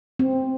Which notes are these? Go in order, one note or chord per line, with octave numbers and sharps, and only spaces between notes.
C4